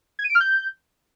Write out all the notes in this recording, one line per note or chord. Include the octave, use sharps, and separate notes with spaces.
G#6
D#7
D7
F6
G6